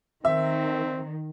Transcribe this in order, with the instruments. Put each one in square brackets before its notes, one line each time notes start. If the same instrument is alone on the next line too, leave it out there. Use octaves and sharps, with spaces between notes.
[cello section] D#3 [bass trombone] C4 [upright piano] E5